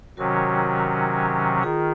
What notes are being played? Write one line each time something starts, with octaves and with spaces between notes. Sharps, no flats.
C3 D#3 F#3 C#4 F#4 A#4
D#3 F4 G#4